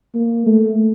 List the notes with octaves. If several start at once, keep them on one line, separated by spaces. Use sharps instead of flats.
A#3
A3